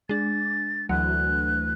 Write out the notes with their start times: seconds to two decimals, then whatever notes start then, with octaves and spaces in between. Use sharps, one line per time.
0.09 G#3 D4 A6
0.89 D2 E3 F#3 F#6